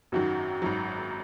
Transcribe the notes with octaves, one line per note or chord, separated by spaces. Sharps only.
G#1 F#2 D#3 F#3 F#4
G#1 F#2 D#3 F#3